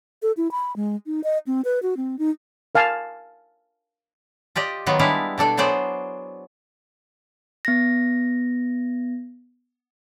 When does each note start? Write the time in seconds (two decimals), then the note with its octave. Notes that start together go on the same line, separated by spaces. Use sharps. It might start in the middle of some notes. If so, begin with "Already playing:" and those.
0.22 A4
0.37 E4
0.51 B5
0.76 G#3
1.06 D#4
1.24 D#5
1.47 C4
1.65 B4
1.83 F#4
1.97 C4
2.19 D#4
2.75 A#4 F5 G#5 A5
4.56 F4 G4 D5 D#5
4.87 D#3 F#3 B3 F4
4.99 G3 G#3 D4 E4 F5
5.38 B2 D4 A4 D5
5.57 F#3 B3 G#4 C5 D5
7.65 B3 A#6